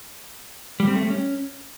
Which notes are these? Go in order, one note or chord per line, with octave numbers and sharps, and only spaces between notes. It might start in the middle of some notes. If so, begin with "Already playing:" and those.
G3
C4
A3
G3
C#4